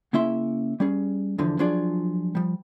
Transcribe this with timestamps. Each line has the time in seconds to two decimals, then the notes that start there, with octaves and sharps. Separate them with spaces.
0.13 C#3 A#3 C#4 E4 E5 C6
0.80 G3 C#4 G#4
1.39 E2 D3 E3 F3
1.59 F3 F#3 D4 F4 G#4 D5
2.35 F3 G3